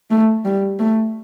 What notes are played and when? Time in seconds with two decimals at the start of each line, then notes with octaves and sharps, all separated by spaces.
0.10 A3
0.45 G3
0.79 A3